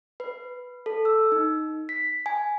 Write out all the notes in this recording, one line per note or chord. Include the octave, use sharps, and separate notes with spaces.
B4
A4
E6
D#4
B6
G#5